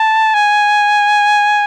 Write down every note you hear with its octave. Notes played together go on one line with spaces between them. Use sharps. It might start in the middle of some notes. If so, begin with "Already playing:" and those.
Already playing: A5
G#5